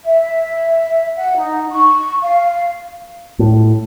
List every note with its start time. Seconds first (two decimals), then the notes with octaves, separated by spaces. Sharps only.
0.05 E5
1.16 F#5
1.36 D#4
1.71 C#6
2.22 F5
3.39 A2